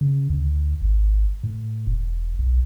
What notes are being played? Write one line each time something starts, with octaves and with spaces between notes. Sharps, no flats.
C#3
D2
G#1
A2
E1
B1